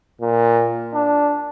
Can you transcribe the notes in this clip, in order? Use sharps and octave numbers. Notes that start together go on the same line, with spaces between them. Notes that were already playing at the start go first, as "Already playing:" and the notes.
A#2
D4